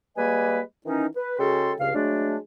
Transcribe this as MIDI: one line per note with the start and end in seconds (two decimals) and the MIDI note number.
0.17 0.60 55
0.17 0.60 56
0.17 0.60 58
0.17 0.60 71
0.17 0.60 75
0.17 0.60 80
0.86 1.07 51
0.86 1.07 52
0.86 1.07 61
0.86 1.07 63
1.16 1.37 71
1.39 1.74 49
1.39 1.74 56
1.39 1.74 66
1.39 1.74 69
1.39 1.74 79
1.39 1.74 84
1.79 1.90 37
1.79 1.90 43
1.79 1.90 49
1.79 1.90 77
1.94 2.37 54
1.94 2.37 56
1.94 2.37 57
1.94 2.37 62